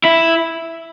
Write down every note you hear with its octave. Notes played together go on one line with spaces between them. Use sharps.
E4